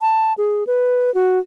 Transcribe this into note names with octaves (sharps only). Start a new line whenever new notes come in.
A5
G#4
B4
F#4